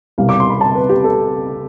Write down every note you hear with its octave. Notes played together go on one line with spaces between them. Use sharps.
C2 B2 G3 F5
D6
C6
B5
A5
B4
G4
A4